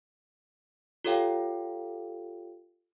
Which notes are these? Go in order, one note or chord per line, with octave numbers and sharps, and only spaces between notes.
F4 G4 A4 C#5 F5 G5